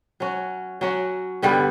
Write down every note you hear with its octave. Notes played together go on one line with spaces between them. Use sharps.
F#3 C#4 F#4
F#3 C#4 F#4
G2 D3 G3 B3